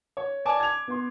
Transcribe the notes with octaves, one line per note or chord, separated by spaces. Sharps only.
C#5
D5 G#5 A5 D6
G#6 F7
B3 C6